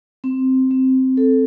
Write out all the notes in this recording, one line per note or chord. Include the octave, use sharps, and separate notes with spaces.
C4
C4
A4